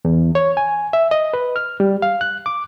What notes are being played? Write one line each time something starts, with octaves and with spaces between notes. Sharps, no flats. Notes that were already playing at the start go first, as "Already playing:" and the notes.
E2
C#5
G#5
E5
D#5
B4
F6
G3
F5
F#6
D6